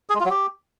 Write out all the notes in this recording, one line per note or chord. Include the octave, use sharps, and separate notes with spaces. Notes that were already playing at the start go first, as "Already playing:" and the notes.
G#4
G#3
F4
F#3
G4